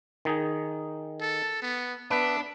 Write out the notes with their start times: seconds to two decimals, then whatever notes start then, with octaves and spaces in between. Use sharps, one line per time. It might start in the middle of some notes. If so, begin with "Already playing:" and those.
0.25 D#3 D#4 G#4
1.21 A4
1.62 B3
2.11 B3 D4 B4 E5